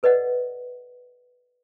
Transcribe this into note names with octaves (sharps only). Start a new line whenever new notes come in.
A4 B4 D5 D#5 F#5